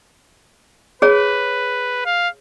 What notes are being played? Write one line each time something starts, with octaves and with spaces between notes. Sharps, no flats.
G#4 B4 C#5
F5